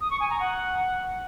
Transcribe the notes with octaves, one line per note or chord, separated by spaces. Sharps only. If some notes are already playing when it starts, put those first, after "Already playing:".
D#6
C#6
G#5
A#5
F#5